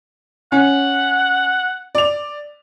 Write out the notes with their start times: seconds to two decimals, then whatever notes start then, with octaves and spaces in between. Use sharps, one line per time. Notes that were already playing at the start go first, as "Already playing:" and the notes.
0.52 C#4 F#5
1.95 D5 F7